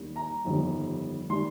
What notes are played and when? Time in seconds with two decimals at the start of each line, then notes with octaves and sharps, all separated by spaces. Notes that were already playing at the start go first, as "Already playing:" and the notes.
Already playing: D#2 D#3 G3
0.16 A#5
0.44 G1 F2 D#3 G3
1.30 D#3 G3 C6